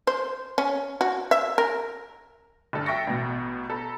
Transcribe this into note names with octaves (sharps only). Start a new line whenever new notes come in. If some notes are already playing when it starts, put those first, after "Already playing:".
C5
C#4
F#4
E5
A#4
G1 A4
E5 G5 C#6 A6 A#6 C#7
A1 B2
A4 A#5 B5